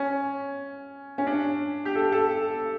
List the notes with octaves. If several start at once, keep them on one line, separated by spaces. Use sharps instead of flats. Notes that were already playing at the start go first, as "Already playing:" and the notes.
Already playing: C#4
C#4
D4
G4
A4
A4